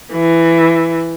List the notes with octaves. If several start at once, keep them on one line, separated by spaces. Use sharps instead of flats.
E3